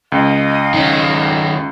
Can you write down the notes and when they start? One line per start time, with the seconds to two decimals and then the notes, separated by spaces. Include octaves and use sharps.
0.12 C#2 D#5 F5
0.74 D#3 C#4